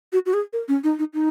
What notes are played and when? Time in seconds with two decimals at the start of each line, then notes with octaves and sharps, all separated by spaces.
0.13 F#4
0.26 F#4
0.34 G#4
0.53 A#4
0.68 C#4
0.84 D#4
0.99 D#4
1.14 D#4